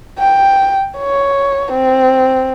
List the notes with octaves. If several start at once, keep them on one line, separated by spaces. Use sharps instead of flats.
G5
C#5
C4